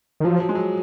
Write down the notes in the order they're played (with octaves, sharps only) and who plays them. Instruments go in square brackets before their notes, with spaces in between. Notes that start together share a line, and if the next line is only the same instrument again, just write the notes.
[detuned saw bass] D#3
[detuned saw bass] F3 [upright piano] F#3
[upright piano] F3
G#3
F#3